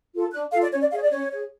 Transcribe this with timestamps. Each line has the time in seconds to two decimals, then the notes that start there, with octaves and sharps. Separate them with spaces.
0.14 F4 A4
0.32 D4 F#6
0.52 F4 A4 F5
0.62 D5
0.72 C#4 C#5
0.82 D5
0.92 G#4 C#5 F5
1.02 D5
1.11 C#4 C#5
1.32 G#4 C#5